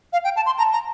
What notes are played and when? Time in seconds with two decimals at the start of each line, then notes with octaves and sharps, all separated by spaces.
0.13 F5
0.24 G5
0.36 A5
0.46 C6
0.58 A5 A#5
0.73 A#5